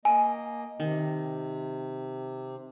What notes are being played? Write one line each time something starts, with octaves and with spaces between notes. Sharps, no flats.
A#3 D#5 G#5
C3 D#3